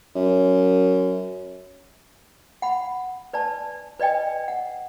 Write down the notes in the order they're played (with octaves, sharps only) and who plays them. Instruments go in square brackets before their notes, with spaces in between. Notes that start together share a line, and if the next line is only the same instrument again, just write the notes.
[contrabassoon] F#2
[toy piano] F#5 B5
B4 D5 G#5 A5
B4 D5 D#5 G5 G#5
F#5